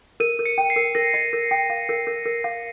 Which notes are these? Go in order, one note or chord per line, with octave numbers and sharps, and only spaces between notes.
A#4 D#7
A#4
C#7
G5
C7
A#4
A#4 A#6
D#5
A#4
G5
F5
A#4
A#4
A#4
F5